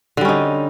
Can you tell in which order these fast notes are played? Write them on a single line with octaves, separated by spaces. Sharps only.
D3 G3 C#4 D#4